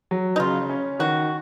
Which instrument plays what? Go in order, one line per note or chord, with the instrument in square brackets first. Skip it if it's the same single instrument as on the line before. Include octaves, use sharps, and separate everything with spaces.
[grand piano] F#3
[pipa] D#4
[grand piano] C#3 [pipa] F4
[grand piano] C#4
[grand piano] D#3 [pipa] F#4